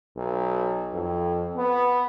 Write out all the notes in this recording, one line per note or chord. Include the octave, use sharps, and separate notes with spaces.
B1
F2
B3